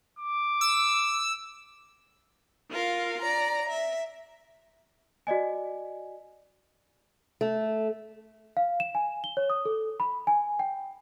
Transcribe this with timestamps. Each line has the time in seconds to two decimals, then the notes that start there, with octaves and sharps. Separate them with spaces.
0.19 D6
0.61 E6
2.69 F4 A#4 F5
3.21 D5 A#5
3.68 E5
5.27 F#4 D5 D#5 G#5
7.41 A3
8.57 F5
8.80 E7
8.95 G#5
9.24 G7
9.37 C#5
9.50 D#6
9.65 A4
10.00 B5
10.27 G#5
10.59 G5